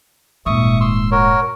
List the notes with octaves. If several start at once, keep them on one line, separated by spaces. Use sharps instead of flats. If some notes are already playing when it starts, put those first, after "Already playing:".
D#1 G#2 E5 C#6 D#6
C6 E6
F#4 A#4 C#5